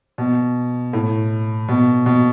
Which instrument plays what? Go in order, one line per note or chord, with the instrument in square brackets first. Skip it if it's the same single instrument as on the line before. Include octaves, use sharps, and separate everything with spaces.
[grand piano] B2
A2
B2
B2